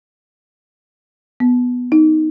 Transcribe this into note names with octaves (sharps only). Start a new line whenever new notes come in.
B3
D#4